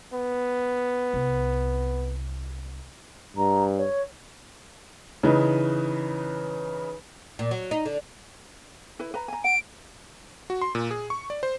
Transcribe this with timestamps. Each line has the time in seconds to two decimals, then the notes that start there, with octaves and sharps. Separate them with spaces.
0.14 B3
1.14 C2
3.36 G2 A#5
3.78 C#5
5.23 C#3 E3 D#4 B4
7.39 A#2
7.51 F#3
7.71 D#4
7.85 D3
8.99 E4 B4
9.14 B4 A#5
9.28 G#5 A#5
9.44 F#5 D7
10.50 F#4
10.62 C6
10.75 A#2
10.91 G#4
11.10 C#6
11.30 D5
11.43 C5